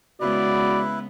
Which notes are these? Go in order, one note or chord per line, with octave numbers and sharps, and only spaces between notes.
C#3 G#3 B3 E4 F#4 B4 D5